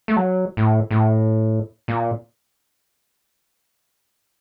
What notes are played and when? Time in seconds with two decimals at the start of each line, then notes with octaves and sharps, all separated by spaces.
0.08 A3
0.16 F#3
0.57 A2
0.91 A2
1.88 A#2